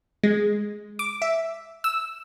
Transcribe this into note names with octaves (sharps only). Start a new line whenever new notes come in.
G#3
D6
E5
E6